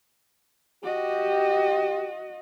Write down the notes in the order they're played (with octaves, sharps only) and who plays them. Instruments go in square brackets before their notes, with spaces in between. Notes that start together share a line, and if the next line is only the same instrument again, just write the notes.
[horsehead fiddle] F#4 D#5 [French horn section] G4